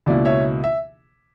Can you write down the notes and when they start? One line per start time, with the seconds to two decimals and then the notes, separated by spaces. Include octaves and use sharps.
0.06 C#2 B2 A#3 E4 D5
0.25 C#5 E5
0.64 E5